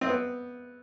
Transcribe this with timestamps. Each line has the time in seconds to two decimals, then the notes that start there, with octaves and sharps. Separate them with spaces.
0.01 C4
0.09 B3